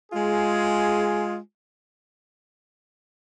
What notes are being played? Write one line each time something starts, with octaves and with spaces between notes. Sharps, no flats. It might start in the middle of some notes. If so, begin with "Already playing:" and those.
G#3 F4 G#4